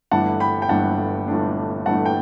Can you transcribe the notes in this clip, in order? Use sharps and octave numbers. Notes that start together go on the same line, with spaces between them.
G1 G2 E3 A3 D4 F#5 A5
G5 B5
G5
G1 G2 E3 A3 D4 F#5 A5
G1 G2 E3 A3 D4
G1 G2 E3 A3 D4 F#5 A5
G5